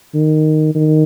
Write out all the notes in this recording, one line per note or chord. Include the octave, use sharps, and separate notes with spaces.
D#3
D#3